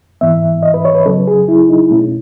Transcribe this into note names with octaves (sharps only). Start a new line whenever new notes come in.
G#2 E3 B3 E5
D#5
B4
C#5
B4
C#3 F#3 C#4 A4
G#4
E4
D#4
B2 A3 C#4 E4